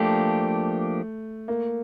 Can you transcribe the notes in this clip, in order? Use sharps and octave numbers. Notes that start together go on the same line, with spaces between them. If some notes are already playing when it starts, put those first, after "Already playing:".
Already playing: F3 A3 A#3 D4 G4
A#3